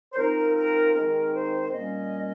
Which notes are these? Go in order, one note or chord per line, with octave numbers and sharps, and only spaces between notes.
C5
F3 C4 D#4 A#4
A#4
D#3 G#3 C4 D#4 A#4
C5
A#2 G3 A#3 C#4 D#5